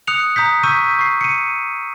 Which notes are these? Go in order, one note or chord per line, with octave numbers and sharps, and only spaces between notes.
D#6 F#6 C#7 F7
A#5 D#6 G6 B6
C#6 E6 G6 B6 D#7
C#6 C7
C#7 D#7